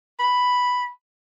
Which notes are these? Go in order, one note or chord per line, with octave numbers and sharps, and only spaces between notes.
B5